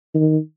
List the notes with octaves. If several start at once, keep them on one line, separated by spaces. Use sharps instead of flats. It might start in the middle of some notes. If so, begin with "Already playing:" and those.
D#3